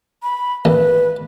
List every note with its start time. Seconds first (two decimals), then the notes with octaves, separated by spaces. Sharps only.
0.23 B5
0.65 A1 B4